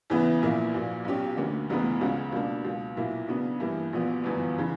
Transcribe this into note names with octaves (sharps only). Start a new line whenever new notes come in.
E2 C#3 E3 B3 E4
A#1 A#2 A#3 E4
A#1 A#2 F#3
B1 B2 F#3 C#4 G4
D2 D3 A#3 C#4
E1 D2 C#3 E3 B3
C#2 C#3 F#3 C#4 F#4
C#2 B2 A#3 D4
C#2 B2 F#3
B1 A#2 A#3 E4
C#3 F#3 B3 D4
G2 E3 A#3 E4
A#1 A#2 F#3 B3
G1 F#2 E3 B3
C#3 E3